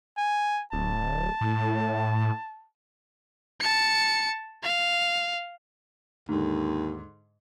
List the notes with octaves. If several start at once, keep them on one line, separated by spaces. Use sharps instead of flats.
G#5
D1 A5
A2
A5 C#7
F5
D#2 G#2 D3